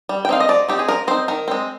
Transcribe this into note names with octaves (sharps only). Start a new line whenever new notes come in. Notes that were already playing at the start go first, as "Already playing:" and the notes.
G3
G5
C4 D#4 F5
D#5
F3 D5
C4 D#4 G4
G#4
F3 A#4
C4 D#4 C5
D#3 A#4
G#3 C4